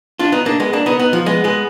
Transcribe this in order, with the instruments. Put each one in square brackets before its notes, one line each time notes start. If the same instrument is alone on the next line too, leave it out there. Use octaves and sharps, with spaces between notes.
[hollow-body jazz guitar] D4 F4
B3 D#4
A#3 D4
G#3 B3
A#3 D4
B3 D#4
B3 D#4
F3
G#3 B3
G#3 B3